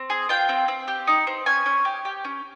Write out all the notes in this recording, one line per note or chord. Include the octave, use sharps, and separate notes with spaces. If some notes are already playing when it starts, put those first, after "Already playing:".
Already playing: C4
G#4
F4 G5
C4
C4
G4
D#4
C4
C#4 G#5
C#4
G4
G4
C#4